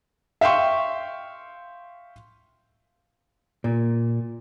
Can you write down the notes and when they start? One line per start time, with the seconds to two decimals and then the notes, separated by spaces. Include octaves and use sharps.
0.41 E5 F5 G5 C6 C#6
3.64 A#2